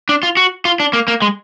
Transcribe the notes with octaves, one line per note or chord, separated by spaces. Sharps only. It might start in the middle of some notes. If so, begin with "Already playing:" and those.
D4
F4
F#4
F4
D4
A#3
A#3
G#3